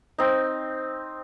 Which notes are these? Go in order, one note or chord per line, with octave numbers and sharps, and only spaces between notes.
C4 D#4